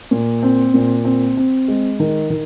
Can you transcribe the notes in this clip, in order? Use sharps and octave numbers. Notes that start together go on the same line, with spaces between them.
A#2
C4
A#2
C4
C4
G#3
D#3
D#3